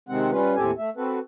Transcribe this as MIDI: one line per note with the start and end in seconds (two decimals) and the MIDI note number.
0.09 0.31 48
0.09 0.31 51
0.09 0.31 56
0.09 0.31 60
0.09 0.31 78
0.32 0.55 55
0.32 0.55 61
0.32 0.55 65
0.32 0.55 71
0.57 0.71 39
0.57 0.71 45
0.57 0.71 60
0.57 0.71 67
0.57 0.71 69
0.57 0.71 80
0.78 0.90 57
0.78 0.90 76
0.97 1.19 60
0.97 1.19 66
0.97 1.19 69
0.97 1.19 71